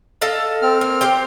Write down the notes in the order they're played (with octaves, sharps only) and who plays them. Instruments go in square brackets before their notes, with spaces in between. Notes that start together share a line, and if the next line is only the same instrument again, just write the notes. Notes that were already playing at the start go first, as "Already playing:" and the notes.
[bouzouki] A4 D#5 F5
[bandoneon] C4 F6
[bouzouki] A#3
G4 C5 G5